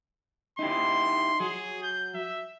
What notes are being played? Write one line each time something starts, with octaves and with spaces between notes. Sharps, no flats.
D#4 E4 G4 C6
F#3 G#4
G6
E5